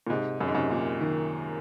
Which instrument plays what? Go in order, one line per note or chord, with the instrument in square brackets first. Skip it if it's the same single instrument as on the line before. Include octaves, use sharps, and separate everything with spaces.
[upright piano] A#2
[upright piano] G#2 [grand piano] C3
[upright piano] F#2
G#2
[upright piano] F#2 [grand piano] C3
[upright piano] A#2
[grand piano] D#3